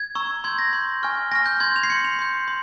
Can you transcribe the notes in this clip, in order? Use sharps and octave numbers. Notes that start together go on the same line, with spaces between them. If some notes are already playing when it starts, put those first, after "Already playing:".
Already playing: G#6
A#5 C#6 E6
C6 G6 G#6
A#6
C6 G6
G#5 C#6 F6
G#5 C#6 F6 A#6
G6
C6 G6 G#6
F7
C7
C6 G6 C#7
F7
C6 G6
C6